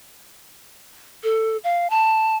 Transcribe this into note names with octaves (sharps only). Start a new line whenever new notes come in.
A4
F5
A5